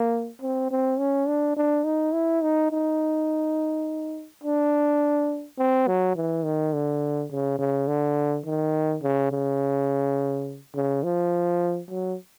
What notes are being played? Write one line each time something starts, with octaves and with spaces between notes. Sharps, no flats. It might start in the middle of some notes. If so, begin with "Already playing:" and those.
Already playing: A#3
C4
C4
C#4
D4
D4
D#4
E4
D#4
D#4
D4
C4
F#3
E3
D#3
D3
C#3
C#3
D3
D#3
C#3
C#3
C#3
F3
F#3